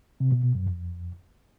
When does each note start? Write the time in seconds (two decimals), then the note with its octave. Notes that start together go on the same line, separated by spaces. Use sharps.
0.20 C3
0.32 B2
0.43 B2
0.55 F#2
0.66 F2